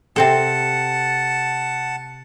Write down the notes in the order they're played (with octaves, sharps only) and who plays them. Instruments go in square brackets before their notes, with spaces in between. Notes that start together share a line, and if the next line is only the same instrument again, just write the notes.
[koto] C3 C4 A4 [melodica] F#5 A5